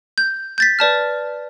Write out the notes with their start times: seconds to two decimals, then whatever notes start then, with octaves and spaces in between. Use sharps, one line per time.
0.18 G6
0.58 G6 A6 B6
0.79 B4 D5 A5 F6